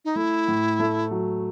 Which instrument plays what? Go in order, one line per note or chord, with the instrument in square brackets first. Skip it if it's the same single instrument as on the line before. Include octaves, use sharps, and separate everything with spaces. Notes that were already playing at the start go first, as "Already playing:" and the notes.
[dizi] D#4
[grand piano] A3 [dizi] E4
[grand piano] A2
A3
F#3